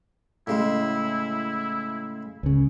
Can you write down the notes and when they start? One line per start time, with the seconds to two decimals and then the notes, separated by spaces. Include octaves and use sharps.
0.47 A2 C#3 G#3 E4
2.43 C#2 C#3